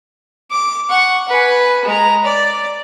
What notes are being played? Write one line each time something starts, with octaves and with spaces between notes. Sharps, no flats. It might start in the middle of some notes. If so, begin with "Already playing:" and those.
D6
F#5 C#6
B4 G#5
G#3 A#5
D5